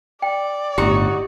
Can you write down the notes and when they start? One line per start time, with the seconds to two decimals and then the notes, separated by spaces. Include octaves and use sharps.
0.22 D5 G5
0.78 G1 A2 D#4 F#4 G4 C#6